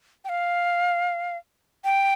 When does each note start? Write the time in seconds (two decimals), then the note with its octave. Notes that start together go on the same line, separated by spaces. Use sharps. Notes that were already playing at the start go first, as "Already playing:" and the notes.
0.25 G5
0.29 F5
1.84 G5